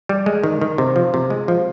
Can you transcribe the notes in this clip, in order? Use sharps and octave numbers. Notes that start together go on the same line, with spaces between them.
G3
G#3
D#3
D#3
C3
F3
C3
G#3
F3